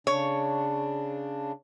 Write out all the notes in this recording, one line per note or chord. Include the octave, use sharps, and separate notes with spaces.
C#3 D4 C#5